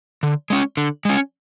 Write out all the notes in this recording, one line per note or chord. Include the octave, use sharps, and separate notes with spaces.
D3
G#3 C#4
D3
G#3 C#4